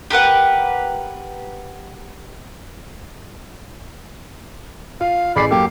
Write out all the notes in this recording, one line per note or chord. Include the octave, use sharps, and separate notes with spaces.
G4 A#4 B4 F#5
F4 F5
A1 G#4 D5 B5 C7
F#2 A#3 G4 A4